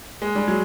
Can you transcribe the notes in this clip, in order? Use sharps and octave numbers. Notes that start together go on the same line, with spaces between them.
G#3
G3
F#3 G#3